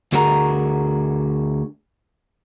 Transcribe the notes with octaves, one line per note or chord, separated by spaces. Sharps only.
D2 D3 F#4 G#4 A#4 A#5